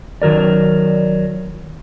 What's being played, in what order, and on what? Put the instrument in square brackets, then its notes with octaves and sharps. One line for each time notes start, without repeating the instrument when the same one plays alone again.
[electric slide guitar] D#3 F#3 A#4 D5